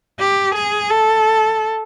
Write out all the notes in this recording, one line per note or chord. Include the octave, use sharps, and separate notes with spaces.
G4
G#4
A4